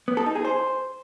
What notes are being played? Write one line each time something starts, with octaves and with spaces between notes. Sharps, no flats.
B3
A4
D#4
G#4
C5